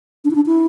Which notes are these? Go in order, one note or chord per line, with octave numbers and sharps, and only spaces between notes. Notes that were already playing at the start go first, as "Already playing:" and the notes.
D4
E4
D4
E4